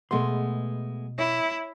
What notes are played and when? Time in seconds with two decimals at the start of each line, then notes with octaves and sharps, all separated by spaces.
0.11 B2 G#3 A3 B3 C6
1.18 E4 C#5